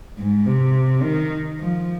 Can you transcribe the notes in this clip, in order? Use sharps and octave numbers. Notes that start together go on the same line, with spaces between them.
G#2
C3
D#3
F3